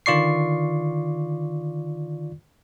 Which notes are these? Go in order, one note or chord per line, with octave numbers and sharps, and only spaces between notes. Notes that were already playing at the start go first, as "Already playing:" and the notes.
D3 D#3 F4 D5 C#6 C7